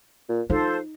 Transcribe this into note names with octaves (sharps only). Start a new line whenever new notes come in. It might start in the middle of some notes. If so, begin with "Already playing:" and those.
A#2
F3 D#4 A4 C5